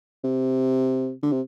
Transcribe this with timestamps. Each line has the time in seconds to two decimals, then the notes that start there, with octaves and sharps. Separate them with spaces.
0.24 C3
1.22 D3
1.32 C3